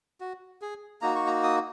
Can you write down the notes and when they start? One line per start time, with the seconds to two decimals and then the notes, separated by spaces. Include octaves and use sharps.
0.21 F#4
0.62 G#4
1.02 A#3 D#4 F#4 A#5
1.15 C#6
1.27 A#5
1.43 D#6